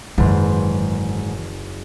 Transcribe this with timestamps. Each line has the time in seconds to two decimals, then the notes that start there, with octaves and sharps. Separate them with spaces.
0.18 F#1 G#2 D#3 E3 B4 C6